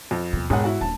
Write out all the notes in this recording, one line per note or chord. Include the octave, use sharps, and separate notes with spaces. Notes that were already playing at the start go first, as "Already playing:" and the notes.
F2
D#2 B2
E1 G#2 G#4 F#5
E4 F#4 F#5
D#1 D4 A5